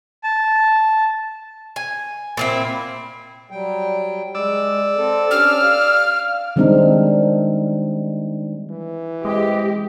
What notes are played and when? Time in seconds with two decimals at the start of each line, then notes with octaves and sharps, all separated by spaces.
0.24 A5
1.76 G#5
2.37 A#2 C4 E4
3.50 F#3 G3 G5
4.35 G#3 D5 E6
4.97 C4 A4
5.31 C#4 D4 G4 F6
5.62 F5
6.56 D#3 G3 G#3 C4 D4 D#4
8.70 E3
9.25 G#3 C4 G4 D#5